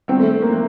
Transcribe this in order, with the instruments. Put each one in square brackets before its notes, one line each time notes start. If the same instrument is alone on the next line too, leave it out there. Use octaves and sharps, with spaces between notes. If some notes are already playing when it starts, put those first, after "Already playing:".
[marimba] D#3 G3 B3 D4 [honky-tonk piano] C4
[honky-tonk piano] A3
A3
A#3
[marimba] F3